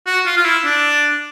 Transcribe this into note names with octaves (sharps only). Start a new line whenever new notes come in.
F#4
F4
F4
E4
D4